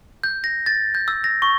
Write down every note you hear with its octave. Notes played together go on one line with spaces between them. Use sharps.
G6
A#6
A6
G6
E6
A#6
C#6